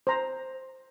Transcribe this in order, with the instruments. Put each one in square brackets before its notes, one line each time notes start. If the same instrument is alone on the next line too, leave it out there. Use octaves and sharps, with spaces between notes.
[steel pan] C5 A#5